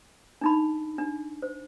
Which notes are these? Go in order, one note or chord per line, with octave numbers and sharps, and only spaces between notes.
D4 D#4 B5
D4
C5